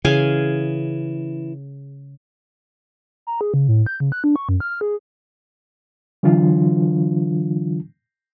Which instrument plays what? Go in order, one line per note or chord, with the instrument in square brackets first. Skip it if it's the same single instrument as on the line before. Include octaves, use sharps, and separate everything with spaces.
[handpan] C#3 C#5 [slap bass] E3 [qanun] G#4 F5 G#5
[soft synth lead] A#5
G#4
C#3
A2
G6
C#3
F#6
D4
C#6
F#2
F6
G#4
[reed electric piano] D3 E3 F#3 D4 F4